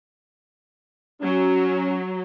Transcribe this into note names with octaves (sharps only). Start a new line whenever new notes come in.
F#3 C#4